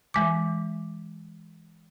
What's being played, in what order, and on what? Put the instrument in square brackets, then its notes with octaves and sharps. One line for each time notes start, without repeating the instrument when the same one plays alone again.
[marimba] E3 G#3 D6